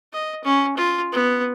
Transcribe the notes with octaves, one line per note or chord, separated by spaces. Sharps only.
D#5
C#4
F4
B3